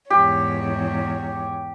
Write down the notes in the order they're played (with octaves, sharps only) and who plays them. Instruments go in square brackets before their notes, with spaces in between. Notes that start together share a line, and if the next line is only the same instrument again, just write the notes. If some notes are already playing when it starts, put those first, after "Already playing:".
[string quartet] E2 G#2 C#5 [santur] G4